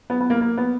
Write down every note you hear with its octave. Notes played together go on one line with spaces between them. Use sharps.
B3
B3
A#3
A#3
B3